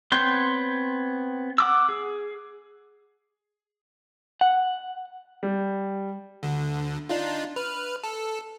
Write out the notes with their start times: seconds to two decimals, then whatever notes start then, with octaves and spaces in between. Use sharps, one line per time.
0.12 B3 C4 C#5 C6 G6
1.58 F#5 D6 E6
1.89 G#4
4.41 F#5
5.43 G3
6.43 D2 D3
7.09 D4 D#4 F4
7.56 B4 F6
8.04 A4